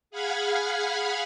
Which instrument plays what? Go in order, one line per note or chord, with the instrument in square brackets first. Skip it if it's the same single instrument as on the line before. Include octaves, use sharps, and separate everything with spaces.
[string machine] G#4 F5 F#5 B5 F6 G#6